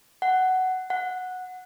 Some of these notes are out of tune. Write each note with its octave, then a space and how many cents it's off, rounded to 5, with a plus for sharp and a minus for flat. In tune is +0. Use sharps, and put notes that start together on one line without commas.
F#5 +10
F#5 -10